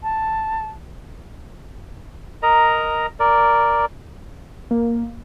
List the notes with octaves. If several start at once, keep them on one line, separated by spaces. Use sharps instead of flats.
A5
A#4 D#5 A#5
A#4 D5
A#3